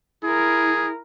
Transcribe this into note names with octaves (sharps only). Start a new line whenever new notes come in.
E4 G#4 A#4